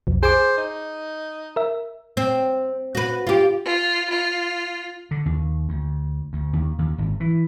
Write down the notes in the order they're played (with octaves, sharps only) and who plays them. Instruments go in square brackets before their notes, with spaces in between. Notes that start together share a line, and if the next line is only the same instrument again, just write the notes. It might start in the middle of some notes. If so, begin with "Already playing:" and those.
[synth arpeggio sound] B1 F2
[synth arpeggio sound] G#4 G#5 D6 [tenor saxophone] C5
[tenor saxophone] D#4
[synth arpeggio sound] A#4 E5
[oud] C4
F#4 B4
F4 G4
[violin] F4
F4
[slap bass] D3
D#2
D2
D2
D#2
D#2
G#1
E3